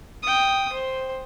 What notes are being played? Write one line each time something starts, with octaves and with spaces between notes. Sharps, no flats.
G5 D#6
C5